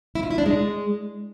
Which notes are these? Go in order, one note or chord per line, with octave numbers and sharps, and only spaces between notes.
E4
F4
E4
D4
G#3